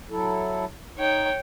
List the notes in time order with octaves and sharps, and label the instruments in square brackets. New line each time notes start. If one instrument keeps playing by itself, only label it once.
[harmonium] F#3 E4 A4
[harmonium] D#4 [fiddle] C#5 G5